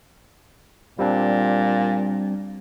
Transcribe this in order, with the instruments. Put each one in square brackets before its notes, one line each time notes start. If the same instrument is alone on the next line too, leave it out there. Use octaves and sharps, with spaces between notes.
[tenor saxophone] A#2 [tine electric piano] G3 C4 D4